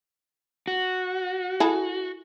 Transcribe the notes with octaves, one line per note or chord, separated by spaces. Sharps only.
F#4
E4 G#4 A4